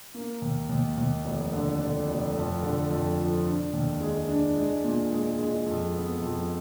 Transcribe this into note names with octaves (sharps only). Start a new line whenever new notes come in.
A#3
D#2
D#2
D#2
F1
D3
D3
F1
F2
D3
F2
F3
D4
D#2
G#3
D4
G#3
A#2
G#3
G#3
F2
B3
F2